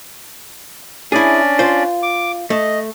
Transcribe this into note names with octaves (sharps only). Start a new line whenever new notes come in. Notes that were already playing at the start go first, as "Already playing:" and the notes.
C#4 D4 E4 G#4 D5
F4 C5
D6
A3 D#5